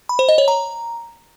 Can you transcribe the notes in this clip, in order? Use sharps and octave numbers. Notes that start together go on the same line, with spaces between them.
B5
C5
D#5
C#5
A#5